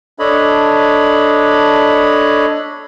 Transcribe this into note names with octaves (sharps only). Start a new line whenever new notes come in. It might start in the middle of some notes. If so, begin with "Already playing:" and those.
D4 A4 C#5 D#5 B5